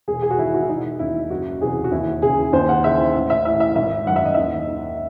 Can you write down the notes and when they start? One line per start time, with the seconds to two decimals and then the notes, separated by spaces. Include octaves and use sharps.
0.08 E1 G#4
0.22 G#4
0.30 F#4
0.38 E2 D#3 E4
0.54 F#4
0.62 E4
0.68 E1 D#4
0.99 D#2 D#3 E4
1.30 F#1 F#4
1.61 E2 C3 E3 G#4
1.84 F#4
1.92 D#2 E4
2.22 C#3 E3 G#4
2.53 D#2 C5
2.69 F#5
2.84 C#3 E3 E5
3.15 A1
3.30 E5
3.45 A2 E3 E5
3.60 E5
3.76 G#1 E5
4.07 F#2 D#3 F#5
4.16 E5
4.25 D#5
4.34 D#2 E5
4.68 D#3